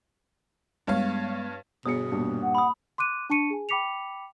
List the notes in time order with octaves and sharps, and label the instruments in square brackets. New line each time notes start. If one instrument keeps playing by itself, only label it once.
[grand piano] G2 C#5 F5 [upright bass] G#3 B3
[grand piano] G1 G#4 C#7 [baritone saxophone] B2 [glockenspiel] D#6
[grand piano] D#1 G2
[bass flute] F#5
[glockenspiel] B5 D#6
[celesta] C6 D6 F#6 D#7
D4 A5 C#6 C#7 D#7
G#4 G#5
G5 B5 D6 B6 C#7 F7